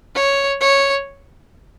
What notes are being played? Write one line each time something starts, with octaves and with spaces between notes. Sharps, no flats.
C#5
C#5